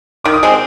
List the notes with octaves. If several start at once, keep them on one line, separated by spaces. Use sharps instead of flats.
D#3 D6
D#6
G#3 C4